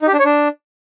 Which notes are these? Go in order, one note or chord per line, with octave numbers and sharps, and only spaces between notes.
D#4
G4
D4
C#5
D4